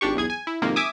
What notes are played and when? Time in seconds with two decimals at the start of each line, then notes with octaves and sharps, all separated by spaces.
0.01 G#1 D4 G4 C#6
0.16 B1 E2 G#4 G#6
0.30 G#5
0.47 E4
0.62 F2 G#2 C3 D#3 A#3
0.76 E5 G#5 D6 D#6